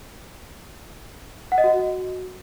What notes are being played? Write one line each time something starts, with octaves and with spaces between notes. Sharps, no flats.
F#5
D#5
F#4